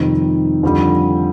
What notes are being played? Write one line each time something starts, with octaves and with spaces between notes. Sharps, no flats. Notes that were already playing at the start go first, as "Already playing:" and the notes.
Already playing: F2 C3 D#3 G3 C4
F2 D3 G3